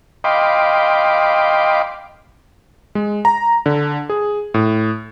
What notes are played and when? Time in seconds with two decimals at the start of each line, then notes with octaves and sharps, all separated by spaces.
0.24 D#5 F5 G5 B5 C6 D6
2.95 G#3
3.25 A#5
3.66 D3
4.10 G#4
4.54 A2